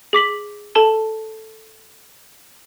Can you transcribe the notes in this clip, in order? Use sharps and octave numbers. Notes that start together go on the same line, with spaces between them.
G#4 D6 B6 F#7
A4 A5 G7